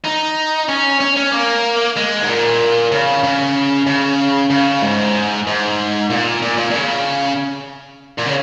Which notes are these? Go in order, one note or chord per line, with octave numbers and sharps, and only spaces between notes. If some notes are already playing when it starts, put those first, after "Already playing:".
D#4
C#4
C#4
C#4
A#3
G#3
G#2
A#2
C#3
C#3
C#3
C#3
G#2
G#2
A#2
A#2
A#2
A#2
C#3
A#2
C#3